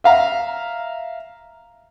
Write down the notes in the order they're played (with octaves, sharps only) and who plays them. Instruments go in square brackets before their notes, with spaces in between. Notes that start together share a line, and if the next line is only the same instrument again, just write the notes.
[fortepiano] E5 F5 A#5